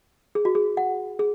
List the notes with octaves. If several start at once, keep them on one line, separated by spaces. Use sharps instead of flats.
G#4
F#4
G#4
F#5
G#4